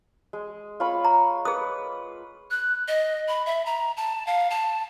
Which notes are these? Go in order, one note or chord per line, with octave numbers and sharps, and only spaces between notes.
G#3
F4 C#5 B5
A#5
G#4 B4 D#6
F#6
D#5
B5
E5
A#5
A5
F5
A5